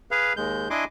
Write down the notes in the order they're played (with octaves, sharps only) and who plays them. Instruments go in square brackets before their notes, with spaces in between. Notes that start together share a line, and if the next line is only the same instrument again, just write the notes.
[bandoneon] G#4 B4 F5
D#2 G#3 G6
D4 E4 D#5 G#5 C6 D6